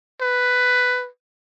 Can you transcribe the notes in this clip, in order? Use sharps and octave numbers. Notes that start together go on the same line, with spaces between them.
B4